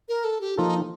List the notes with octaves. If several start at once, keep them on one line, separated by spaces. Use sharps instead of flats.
A#4
A4
G4
F3 A#3 D#4 F4 A4